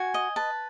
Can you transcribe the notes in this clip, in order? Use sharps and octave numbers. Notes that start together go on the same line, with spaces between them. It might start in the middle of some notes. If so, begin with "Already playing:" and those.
Already playing: F#4 G#5
D#5
B4 A5